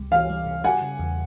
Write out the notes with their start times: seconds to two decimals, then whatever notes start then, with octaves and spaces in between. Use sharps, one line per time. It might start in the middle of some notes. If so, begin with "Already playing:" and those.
Already playing: C#2 C3 G3
0.11 E3 F5
0.29 G3
0.47 C3
0.64 G3 F#5 G#5
0.81 C#3
0.99 E2